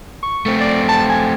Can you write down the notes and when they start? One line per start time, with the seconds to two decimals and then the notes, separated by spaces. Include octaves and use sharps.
0.23 C#6
0.46 A3 C4
0.61 D5
0.89 A5
1.09 G#5